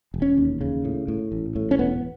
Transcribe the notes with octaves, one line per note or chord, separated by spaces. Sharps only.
E1
C#4
D#2
C#3
A2
A2
A1
A2
C#4
E1 B3